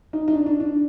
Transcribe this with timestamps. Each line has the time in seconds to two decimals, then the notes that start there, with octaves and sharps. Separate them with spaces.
0.13 D#4
0.28 D#4
0.33 D4
0.46 D4
0.60 D4